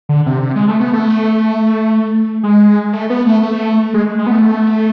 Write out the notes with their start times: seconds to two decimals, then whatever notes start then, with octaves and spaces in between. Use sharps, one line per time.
0.09 D3
0.26 C3
0.43 C3
0.56 G#3
0.68 A3
0.80 B3
0.93 A3
2.43 G#3
2.93 A3
3.10 B3
3.27 A3
3.43 A3
3.94 G#3
4.19 G#3
4.27 B3
4.32 A3